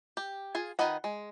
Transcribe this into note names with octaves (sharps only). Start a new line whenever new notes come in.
G4
F4 G#4 G#5
D#3 F4 B4 D#5 F#5
G#3